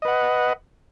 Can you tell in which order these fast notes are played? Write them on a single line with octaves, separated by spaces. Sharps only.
D#5 B4 F#5